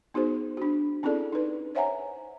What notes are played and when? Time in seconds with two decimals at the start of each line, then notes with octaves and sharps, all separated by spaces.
0.14 B3 D#4 F#4 G#4 C5
0.57 D4 F#4
1.03 C4 C#4 E4 G#4 A4 D5
1.32 D#4 B4
1.75 C5 C#5 E5 F#5 G#5 A#5